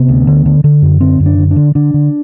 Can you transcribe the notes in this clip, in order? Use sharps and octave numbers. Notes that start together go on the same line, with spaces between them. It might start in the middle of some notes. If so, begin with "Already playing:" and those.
Already playing: C3 B3
D2
D3
D3
D3
F#2
D3 C4
F#2
D4
D3
D4
D3
D3 D4
D3